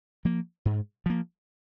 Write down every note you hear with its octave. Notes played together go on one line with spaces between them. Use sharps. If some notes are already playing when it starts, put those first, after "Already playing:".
F3 A#3
G#2
F3 A#3